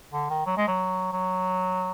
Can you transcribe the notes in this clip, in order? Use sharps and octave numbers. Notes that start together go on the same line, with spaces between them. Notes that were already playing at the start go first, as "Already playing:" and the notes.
D3
D#3
F#3
G#3
F#3
F#3